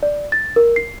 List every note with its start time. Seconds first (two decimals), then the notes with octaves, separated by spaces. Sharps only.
0.03 D5
0.32 A6
0.56 A#4
0.76 C7